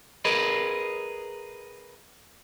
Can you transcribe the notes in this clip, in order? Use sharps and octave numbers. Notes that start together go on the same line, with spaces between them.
G#4 A#4 B4 D#5